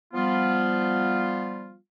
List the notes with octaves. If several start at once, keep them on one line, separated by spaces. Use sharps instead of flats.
F3 G3 B3 F4